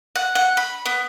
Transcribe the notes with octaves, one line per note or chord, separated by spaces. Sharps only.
F#5
F#5
B5
B3